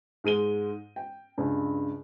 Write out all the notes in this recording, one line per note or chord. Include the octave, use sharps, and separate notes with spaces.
G#2 G#3 D#7 G7
G5
C#2 G2